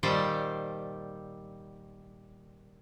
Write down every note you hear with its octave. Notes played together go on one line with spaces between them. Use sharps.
A#2 D#3 G3 A4 C5